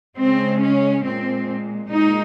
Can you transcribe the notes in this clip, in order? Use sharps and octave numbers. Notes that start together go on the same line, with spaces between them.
C#3 G#3 C4
C#4
A#2 G#3 C4
A#2 G#3 D#4